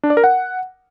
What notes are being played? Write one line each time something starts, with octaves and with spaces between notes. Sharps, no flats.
D4
D5
A#4
F#5